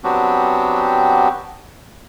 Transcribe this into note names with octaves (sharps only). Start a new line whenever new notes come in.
F#3 B3 C4 D4 F#4 G4